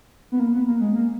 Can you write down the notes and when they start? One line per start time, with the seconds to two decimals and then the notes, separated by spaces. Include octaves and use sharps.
0.32 B3
0.40 A#3
0.54 B3
0.67 A#3
0.80 G#3
0.95 A#3